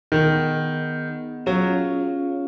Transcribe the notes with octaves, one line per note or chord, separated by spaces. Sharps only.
D#3 B3 D#4 G#4 D#5 F#5
F#3 C#4 F4 G#4 C#5 F5